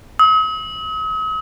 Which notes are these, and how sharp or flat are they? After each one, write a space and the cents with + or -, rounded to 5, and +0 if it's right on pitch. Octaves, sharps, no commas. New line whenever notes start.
D#6 +45